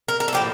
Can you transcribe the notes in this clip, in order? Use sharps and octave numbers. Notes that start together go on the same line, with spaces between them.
A#4
A#4
A4
A2 F3 A#3 G4